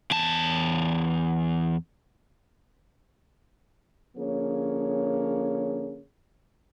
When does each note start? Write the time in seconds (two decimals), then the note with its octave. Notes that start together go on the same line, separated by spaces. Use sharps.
0.11 E2 A5
4.17 D3 F3 A#3 C#4 G#4 C#5